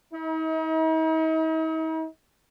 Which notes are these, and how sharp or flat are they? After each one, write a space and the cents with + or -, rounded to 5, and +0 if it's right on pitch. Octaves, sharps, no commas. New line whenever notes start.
D#4 +45